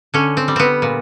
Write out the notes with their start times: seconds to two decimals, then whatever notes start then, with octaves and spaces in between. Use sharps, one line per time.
0.14 D3 C#4
0.37 C4
0.48 G3
0.56 B3 C4
0.82 A#2